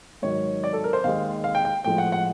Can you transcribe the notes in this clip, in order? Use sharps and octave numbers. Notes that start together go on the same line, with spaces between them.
G#2 D#3 F#3 C#5
D5
A4
A#4
C5
D#2 D#3 G#3 F5
F5
G5
G5
A2 F3 G#3 G5
F#5
F#5